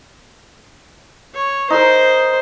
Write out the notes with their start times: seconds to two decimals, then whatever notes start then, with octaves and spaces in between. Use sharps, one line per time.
1.34 C#5
1.70 D#4 A#4 C5